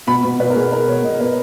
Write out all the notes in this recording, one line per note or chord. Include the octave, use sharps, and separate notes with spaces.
B2 B5
B2
B2 B4
A#4
B2 G#4
B2 A#4
B2 C#5
B2 D#5
B2 B4